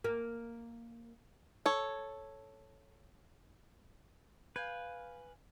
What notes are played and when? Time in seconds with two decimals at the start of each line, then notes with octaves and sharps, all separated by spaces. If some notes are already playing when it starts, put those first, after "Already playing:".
0.04 A#3
1.66 A4 C#5
4.56 B4 F5 G5 G#5